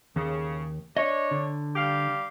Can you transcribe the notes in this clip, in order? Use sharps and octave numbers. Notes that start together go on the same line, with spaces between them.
D#2 C#3
D4 C#5 D#5
D3
G3 G4 F5